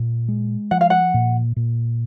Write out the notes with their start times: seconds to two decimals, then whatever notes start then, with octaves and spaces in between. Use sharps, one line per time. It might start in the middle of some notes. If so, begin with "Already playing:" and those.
Already playing: A#2
0.28 G#3
0.71 F3 F#5
0.81 F5
0.90 F#5
1.14 A#2
1.56 A#2